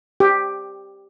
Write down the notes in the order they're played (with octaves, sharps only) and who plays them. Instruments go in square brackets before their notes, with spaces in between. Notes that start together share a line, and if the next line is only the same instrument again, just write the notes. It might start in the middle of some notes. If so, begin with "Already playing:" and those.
[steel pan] G4